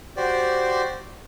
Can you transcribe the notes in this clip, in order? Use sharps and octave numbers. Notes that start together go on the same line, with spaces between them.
F#4 G4 C5 D5